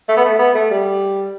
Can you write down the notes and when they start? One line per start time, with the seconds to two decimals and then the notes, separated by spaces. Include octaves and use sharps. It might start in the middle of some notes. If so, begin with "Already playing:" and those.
0.08 A3
0.17 B3
0.25 A3
0.39 B3
0.55 A3
0.70 G3